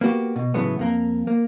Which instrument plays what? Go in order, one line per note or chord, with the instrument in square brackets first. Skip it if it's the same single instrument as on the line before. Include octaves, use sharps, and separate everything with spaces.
[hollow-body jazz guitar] A#3 B3 F#4 G4
B2
A2 C#3 E3 F#3 A3 B3
F2 A#3 A#4
A#3